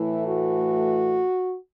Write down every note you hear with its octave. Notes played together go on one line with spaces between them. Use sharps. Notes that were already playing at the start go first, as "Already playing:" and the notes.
Already playing: A2 E3 A3 E4
F#4